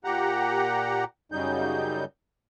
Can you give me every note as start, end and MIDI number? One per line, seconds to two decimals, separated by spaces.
0.05 1.04 46
0.05 1.04 67
0.05 1.04 78
0.05 1.04 82
1.32 2.05 42
1.32 2.05 49
1.32 2.05 54
1.32 2.05 55
1.32 2.05 63
1.32 2.05 91